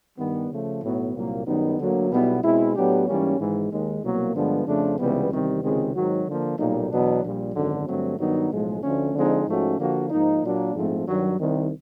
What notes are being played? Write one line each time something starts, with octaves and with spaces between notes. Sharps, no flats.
G2 D#3 G3 B3
C#3 F3 A3
B1 A2 F#3 B3
C2 A#2 F#3 A#3
F#2 D#3 G3 B3 D#4
D2 D3 F#3 A#3
B1 B2 G3 B3 E4
B2 G#3 C4 E4
A2 F#3 B3 D4 G4
G#2 E3 G3 A#3 C#4
G#1 G#2 E3 G#3
D#2 D#3 G#3
C2 B2 F#3 A#3
G2 D3 F3 G#3 B3
F2 C#3 F3 A3 D4
C#2 C3 E3 G3 B3
E2 C3 D#3 G3 C4
C#2 C3 D#3 G#3 C4
G#1 G#2 D#3 F#3
D3 F3 A#3
B1 A#2 G3 A#3 D#4
E2 B2 F#3 B3 D4
A#1 A#2 G3
G#1 F#2 D3
G2 D3 F#3 A3 C4
G2 D#3 F#3 B3 D#4
B1 A2 F3 G#3
D2 D3 F3 A3 C#4
D3 F3 G#3 C4 D#4
G#2 F3 A3 C#4 F#4
D3 F3 A#3 D4 F#4
G#2 F3 A#3 D#4
A#2 F#3 A#3 D4
A#1 G#2 F3 A3 C4
G2 D#3 F#3
C2 C3 D#3